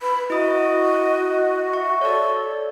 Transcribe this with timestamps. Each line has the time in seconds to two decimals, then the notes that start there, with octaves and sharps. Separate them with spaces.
0.02 B4 B5
0.30 E4 F#4 D#5 D#6
1.73 E5 C#6
2.01 A4 C#5 D5